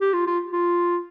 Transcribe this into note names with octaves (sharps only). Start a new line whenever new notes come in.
G4
F4
F4
F4